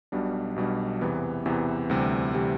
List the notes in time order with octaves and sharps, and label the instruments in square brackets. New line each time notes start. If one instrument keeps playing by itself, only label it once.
[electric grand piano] B1 B2 G3 D4
B1 B2 G3 D4
E2 C3 E3 B3
E2 C3 E3 B3
D2 C3 E3 G3
C3 E3 G3